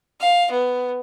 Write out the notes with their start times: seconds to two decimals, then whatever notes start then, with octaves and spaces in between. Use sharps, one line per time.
0.19 F5
0.51 B3